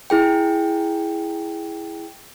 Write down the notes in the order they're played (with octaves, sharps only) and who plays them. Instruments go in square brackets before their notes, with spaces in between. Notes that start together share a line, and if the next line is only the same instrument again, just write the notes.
[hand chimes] E4 G#4 G5